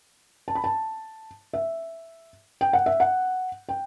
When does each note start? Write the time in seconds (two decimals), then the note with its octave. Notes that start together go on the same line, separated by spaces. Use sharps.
0.48 A5
0.55 B5
0.64 A5
1.53 E5
2.61 G5
2.73 F#5
2.86 E5
3.00 F#5
3.69 G5